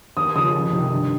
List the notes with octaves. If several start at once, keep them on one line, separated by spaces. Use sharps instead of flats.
D#2 D#6
C#3 F3 D#6
F2
C3 D#3
G2